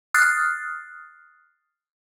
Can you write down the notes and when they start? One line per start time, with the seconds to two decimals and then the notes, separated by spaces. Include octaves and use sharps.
0.14 D#6 F6 F#6 A6 C7